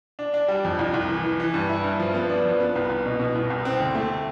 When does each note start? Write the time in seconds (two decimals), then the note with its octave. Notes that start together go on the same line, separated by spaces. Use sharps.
0.19 D4
0.34 D4
0.48 G3
0.65 F2
0.79 C2
0.94 C2
1.09 E3
1.24 E3
1.40 E3
1.54 G2
1.69 E4
1.84 G2
2.00 F3
2.14 B3
2.30 D4
2.45 F3
2.60 B3
2.76 C2
2.89 C2
3.06 B2
3.20 B2
3.35 C2
3.50 C2
3.65 C4
3.80 D2
3.95 A3